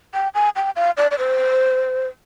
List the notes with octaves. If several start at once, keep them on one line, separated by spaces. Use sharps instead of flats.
G5
G#5
G5
F5
D5
D5
C5